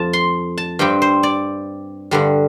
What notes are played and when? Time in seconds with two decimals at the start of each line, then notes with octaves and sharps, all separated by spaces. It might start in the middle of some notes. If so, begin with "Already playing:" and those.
Already playing: F2 F3 A5
0.13 C6
0.58 A5
0.79 G2 G3 C4 G5
1.02 C5
1.23 D5
2.11 G2 D3 G3